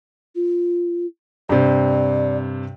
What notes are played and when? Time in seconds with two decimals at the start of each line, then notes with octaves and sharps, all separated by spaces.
0.35 F4
1.49 G2 C3 D5